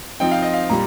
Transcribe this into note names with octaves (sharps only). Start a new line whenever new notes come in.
F3 C4 D#4 G5
F5
D#5
F5
A#2 G3 A#5